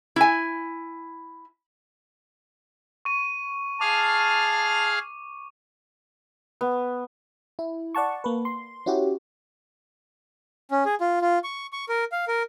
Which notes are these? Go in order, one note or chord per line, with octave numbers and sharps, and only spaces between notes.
E4 G#5
C#6 D#7
G#4 F5 A5 D6 F6
B3
E4
D5 F#5 A5 C#6
A#3 B4
C6
C#4 E4 F#4 G4
C#4
G#4
F4
F4
C#6
C#6
A#4
F5
A#4